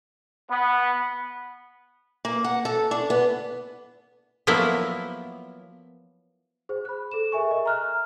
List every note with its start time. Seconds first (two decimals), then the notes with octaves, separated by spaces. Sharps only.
0.51 B3
2.25 A#3
2.44 F#5
2.65 A4
2.91 D4
3.10 B3
4.47 F3 F#3 A#3 B3 E4
6.69 G#4 C5
6.85 B5 F#6
7.12 A4 E7
7.32 G#4 A#4 E5 G#5 C#6
7.51 D#5 E5
7.66 A#5 F6 F#6